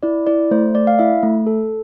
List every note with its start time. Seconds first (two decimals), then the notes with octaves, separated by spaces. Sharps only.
0.03 E4 D5
0.27 E4 D5
0.51 A3 C5
0.74 A3 D5
0.87 F5
0.99 E4 E5
1.23 A3
1.46 A4